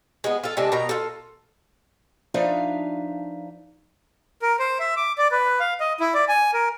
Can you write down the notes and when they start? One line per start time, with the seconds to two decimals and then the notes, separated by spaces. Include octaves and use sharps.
0.24 G#3 B3
0.44 F4 A4
0.57 C3 G#3 D4 A4
0.72 B2 D#3 A#4 A#5
0.89 F4 A4
2.34 F3 D4 D#4 B4 E5 F5
4.42 A#4
4.59 C5
4.80 E5
4.97 D6
5.18 D5
5.31 B4
5.60 F5
5.80 D#5
6.00 E4
6.14 D5
6.28 G#5
6.53 A#4